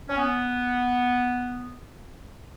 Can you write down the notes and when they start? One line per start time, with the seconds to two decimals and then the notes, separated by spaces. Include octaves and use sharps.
0.09 C#4
0.17 B3